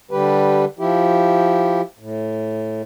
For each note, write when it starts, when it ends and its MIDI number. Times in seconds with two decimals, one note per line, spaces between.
0.11 0.65 50
0.11 0.65 55
0.11 0.65 67
0.11 0.65 71
0.79 1.81 53
0.79 1.81 64
0.79 1.81 67
1.99 2.82 45